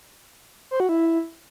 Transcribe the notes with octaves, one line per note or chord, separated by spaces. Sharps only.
C5
F#4
E4